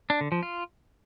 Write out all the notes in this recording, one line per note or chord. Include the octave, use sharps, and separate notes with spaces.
D4
D3
F3
F4